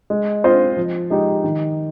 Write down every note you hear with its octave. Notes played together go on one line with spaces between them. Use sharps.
G#3
C4 F4 C5 D#5
F3
G#3 D#4 G4
D#3